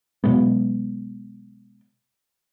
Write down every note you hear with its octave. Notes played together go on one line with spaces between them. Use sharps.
B2 F#3 G#3 B3